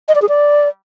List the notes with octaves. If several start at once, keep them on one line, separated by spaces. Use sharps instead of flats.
D#5
D5
G#4
D5